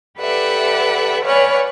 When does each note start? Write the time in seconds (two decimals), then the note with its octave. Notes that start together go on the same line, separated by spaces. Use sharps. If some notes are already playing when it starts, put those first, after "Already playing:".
0.19 G4 A4 B4 D5 E5 F#5
1.25 B4 C#5 D5 F#5 G#5 F6